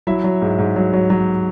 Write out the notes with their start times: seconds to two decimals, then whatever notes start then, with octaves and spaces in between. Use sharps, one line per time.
0.07 F#3 E4 E5
0.24 F#3
0.42 G#2
0.59 G#2
0.76 F#3
0.93 F#3
1.10 F#3